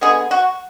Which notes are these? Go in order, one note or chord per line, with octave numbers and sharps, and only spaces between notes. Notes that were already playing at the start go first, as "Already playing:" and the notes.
D3 G#3 B3 G#4
F#4